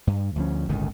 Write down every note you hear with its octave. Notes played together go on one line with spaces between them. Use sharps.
G2
D2 F3 C#4
G1 C#2 A2 D#3